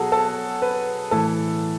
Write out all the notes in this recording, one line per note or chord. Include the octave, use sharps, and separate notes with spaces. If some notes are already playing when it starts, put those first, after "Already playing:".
Already playing: B2 F#3 F#4 G#4 A4
A4
B4
A2 E3 A4